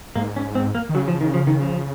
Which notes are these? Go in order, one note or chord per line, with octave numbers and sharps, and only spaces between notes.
G#2 A#3
C#4
C4
A#3
D#3
C#3 F#3
F3
D#3
F3
D#3
F3